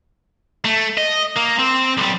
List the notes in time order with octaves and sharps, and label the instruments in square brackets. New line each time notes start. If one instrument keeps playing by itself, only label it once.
[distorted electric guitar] A3
D#5
A#3
C4
B1 G3